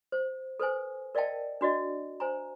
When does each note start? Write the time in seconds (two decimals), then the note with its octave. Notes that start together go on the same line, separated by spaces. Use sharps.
0.12 C5
0.60 A4 B4 C5 G#5
1.15 A#4 D5 D#5 F5 G5 A5
1.61 D4 F#4 D5 D#5
2.20 C5 G#5 A#5